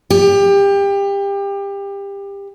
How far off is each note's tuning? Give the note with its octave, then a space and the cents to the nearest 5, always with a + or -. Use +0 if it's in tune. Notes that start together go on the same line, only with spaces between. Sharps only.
G4 +25